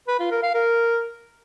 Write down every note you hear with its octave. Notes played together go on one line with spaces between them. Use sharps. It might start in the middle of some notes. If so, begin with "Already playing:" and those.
B4
F4
A#4
F5
A#4